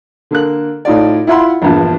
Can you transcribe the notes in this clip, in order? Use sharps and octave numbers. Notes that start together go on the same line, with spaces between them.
D3 A#3 A4 F#6
A2 D#4 F4 D5
E4 F4 E5 F#5 B5 C6
A#1 E2 G2 F3